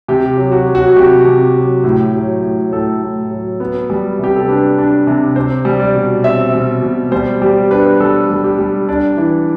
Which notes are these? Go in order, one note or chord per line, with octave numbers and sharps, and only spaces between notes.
C3 G4
F#3
F#4
F#3
F#4
C3 G4
C3
F#3
A2
F#3
A2
A2 A4
A2
F#3
B3
G3
C3 G4
A4
D4 B4
D4
C3
C4 C5
G3
D5
B2
C4 E5
B2
B2
G3 C5
G3 G4
D4 B4
G3 A4
G3
G4
G3
D4 D5
E3